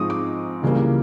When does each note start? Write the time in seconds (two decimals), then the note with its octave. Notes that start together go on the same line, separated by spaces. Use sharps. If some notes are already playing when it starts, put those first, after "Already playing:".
Already playing: G#2 F3 G#3 C4 D#4 C#6 D#6
0.10 D6
0.63 C#2 C#3 E3 G3 A#3